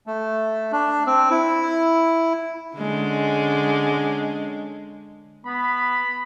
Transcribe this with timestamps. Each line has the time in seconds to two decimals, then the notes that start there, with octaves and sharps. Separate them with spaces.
0.07 A3
0.72 D4
1.07 C4
1.31 E4
2.77 D3 G#3 C#4
5.46 B3 B5